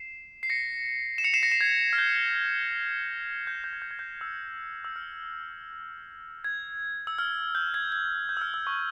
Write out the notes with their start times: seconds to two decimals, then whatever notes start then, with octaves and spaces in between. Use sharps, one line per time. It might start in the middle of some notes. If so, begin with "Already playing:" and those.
Already playing: C7 E7
0.43 C7
0.50 A#6 C#7
1.18 E7
1.24 C#7 F7
1.34 C7 E7
1.43 A#6 C#7
1.52 C7 E7
1.61 G#6
1.93 F6
1.98 G6
3.47 G6
3.55 G#6
3.64 G6
3.73 G#6
3.82 G6
3.91 G#6
3.99 G6
4.21 E6
4.84 E6
4.96 F6
6.44 G#6
7.07 E6
7.18 F6
7.55 G6
7.74 G#6
7.92 G#6
8.29 G6
8.37 E6
8.41 F6
8.54 E6
8.67 C#6